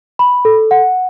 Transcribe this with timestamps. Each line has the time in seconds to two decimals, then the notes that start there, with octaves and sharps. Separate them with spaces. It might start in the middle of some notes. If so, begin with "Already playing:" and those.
0.19 B5
0.45 A4
0.71 F#5